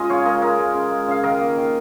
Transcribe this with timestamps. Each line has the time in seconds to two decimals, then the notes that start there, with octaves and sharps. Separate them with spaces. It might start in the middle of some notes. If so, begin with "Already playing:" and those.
Already playing: G#3 C#4 F4 G#4 D#5
0.09 C#3 C#5 F5
0.25 G#3 A#4 D#5
0.42 C#3 A#4 D#5
0.59 G#3
0.75 C#3
0.91 G#3
1.08 C#3 F5
1.23 D#3 A#4 D#5
1.41 A#3
1.57 D#3